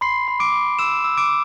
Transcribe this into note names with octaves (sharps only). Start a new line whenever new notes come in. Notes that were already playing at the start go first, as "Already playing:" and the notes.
B5 C6 C7
B5
D6 D7
B5
E6 E7
E6
D6 D7